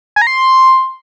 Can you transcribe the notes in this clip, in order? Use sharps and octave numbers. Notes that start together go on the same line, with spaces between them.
G#5
A#5
C6